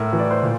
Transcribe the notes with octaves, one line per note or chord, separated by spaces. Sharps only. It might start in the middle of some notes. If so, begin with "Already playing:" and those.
Already playing: A2 A#4
E3
D5
C5
A#2